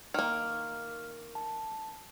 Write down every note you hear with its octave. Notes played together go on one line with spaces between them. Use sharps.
D#3 A#3 F6
A5